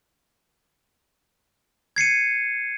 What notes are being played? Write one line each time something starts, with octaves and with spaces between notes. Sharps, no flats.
G#6 C7 C#7 D#7